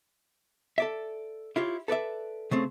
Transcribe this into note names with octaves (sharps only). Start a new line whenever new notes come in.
A4 D5 E5
E4 F4 G4 C#5
A4 B4 D5 E5
C#3 A3 C4